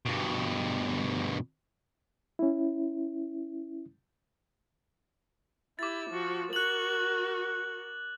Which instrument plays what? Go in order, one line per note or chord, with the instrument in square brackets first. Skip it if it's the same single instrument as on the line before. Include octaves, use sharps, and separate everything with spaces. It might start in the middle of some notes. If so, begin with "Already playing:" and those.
[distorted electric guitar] G2 B2
[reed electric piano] C#4 E4
[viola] E4 G4 [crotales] D6 A6
[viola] F3 F#4
[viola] F#4 A#4 [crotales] F#6 F#7